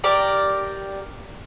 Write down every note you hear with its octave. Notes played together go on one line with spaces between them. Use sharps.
G4 A#4 D5